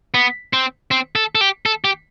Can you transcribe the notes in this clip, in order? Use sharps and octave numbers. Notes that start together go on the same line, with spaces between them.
B3
C4
C4
A4
A4
G4
A4
G4